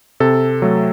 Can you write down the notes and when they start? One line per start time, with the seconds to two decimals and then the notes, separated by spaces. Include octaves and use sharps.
0.20 C3 A4
0.62 F#3 A3